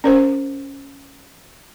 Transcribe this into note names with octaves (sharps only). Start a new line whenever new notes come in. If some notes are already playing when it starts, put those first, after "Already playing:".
C#4 A#4 C5